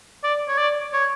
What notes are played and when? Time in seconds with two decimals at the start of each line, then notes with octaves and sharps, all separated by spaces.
0.23 D5
0.48 C#5
0.58 D5
0.93 C#5